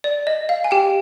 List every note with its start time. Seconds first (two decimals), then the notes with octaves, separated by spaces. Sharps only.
0.04 D5
0.27 D#5
0.49 F5
0.64 G#5
0.71 G4 G5